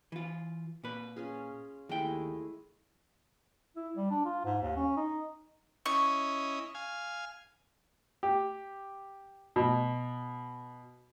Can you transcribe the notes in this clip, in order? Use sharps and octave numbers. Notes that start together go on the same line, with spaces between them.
E3 F4
A#2 B4
C#4 F4 G#4
D#2 G#3 A3 E4 G5
E4
G3
D4
F4
G#2
D#2
C#4
D#4
C#4 E4 D#5 C#6
F5 G#5
G4
B2